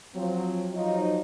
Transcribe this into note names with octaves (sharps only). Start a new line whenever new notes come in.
F3 F#3 C4
F3 F#3 D#4